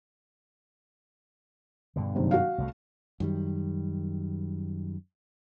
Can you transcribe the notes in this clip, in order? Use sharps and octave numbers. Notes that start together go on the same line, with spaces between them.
G2 B2 D3
F#1 C3 D#3
F#4 F5
C2 F#3 A3
F#2 D#3 G3